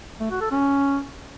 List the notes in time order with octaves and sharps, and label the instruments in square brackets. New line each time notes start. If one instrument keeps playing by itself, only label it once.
[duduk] A3
F#4
A4
C#4